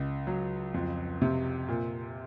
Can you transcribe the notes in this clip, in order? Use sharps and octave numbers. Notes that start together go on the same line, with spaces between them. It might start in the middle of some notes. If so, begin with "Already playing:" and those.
Already playing: C#2
F#3
F2
C3
A#2